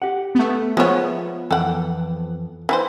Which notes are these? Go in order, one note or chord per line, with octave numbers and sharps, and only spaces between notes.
G4 F#5
A3 B3
F3 G#3 B3 F4 C#5 E5
F2 E3 A4 F#5 G5
E3 B4 C5